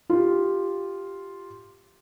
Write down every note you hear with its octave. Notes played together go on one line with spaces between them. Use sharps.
F4 G4